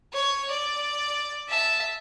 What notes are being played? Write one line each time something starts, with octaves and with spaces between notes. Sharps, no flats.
C#5
D5
E5 A5